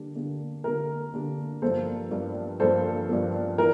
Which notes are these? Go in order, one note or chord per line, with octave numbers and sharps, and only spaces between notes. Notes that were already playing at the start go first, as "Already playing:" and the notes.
Already playing: D3 G3 A#3 D4
D3 G3 A#3 D4
D3 G3 A#3 D4 A#4
D3 G3 A#3 D4
G2 F3 A#3 A4 C5
G2 F3 A#3
G2 F3 A#3 A4 C5
G2 F3 A#3
E3 A#4